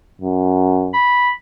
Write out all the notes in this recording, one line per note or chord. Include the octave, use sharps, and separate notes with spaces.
F#2
B5